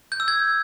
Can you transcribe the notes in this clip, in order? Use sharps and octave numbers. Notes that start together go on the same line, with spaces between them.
G6
E6
G#6